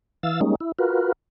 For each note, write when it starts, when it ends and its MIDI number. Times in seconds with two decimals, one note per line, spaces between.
0.23 0.40 52
0.23 0.40 77
0.23 0.40 88
0.23 0.40 93
0.41 0.55 55
0.41 0.55 56
0.41 0.55 58
0.41 0.55 61
0.41 0.55 63
0.60 0.72 64
0.79 1.12 65
0.79 1.12 66
0.79 1.12 70
0.79 1.12 71